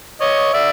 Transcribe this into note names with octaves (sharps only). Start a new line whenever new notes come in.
C#5 D#5
D5 E5